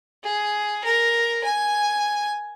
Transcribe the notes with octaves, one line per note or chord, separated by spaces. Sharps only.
G#4
A#4
G#5